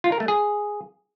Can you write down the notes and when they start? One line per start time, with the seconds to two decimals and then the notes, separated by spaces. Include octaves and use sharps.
0.04 F4
0.12 A#4
0.20 A3
0.28 G#4